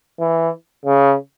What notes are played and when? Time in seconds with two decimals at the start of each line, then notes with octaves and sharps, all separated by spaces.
0.19 E3
0.85 C#3